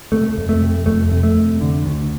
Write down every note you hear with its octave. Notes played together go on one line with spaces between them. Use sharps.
C3 A3
F2
A3
C3
F2 A3
C3
A3
F2
D3
D2